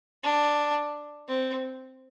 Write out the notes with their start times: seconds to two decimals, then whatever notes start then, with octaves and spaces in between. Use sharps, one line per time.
0.24 D4
1.28 C4